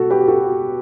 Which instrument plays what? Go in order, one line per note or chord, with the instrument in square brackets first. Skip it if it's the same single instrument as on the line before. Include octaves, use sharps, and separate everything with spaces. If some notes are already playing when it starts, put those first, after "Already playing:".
Already playing: [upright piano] B2 F#4 A4
G4 B4
F#4 A4